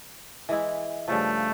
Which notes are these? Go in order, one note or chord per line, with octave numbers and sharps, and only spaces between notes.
E3 G#3 E4
G2 C#3 F3 A3